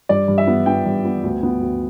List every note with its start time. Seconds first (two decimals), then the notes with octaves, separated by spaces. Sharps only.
0.09 G2 D5
0.28 G2
0.38 E5
0.47 B3
0.66 B3 G5
0.86 G2
1.05 B3
1.23 D2
1.43 B3
1.62 D2